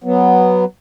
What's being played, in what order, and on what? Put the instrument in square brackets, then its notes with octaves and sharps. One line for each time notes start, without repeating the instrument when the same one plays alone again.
[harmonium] F#3 B3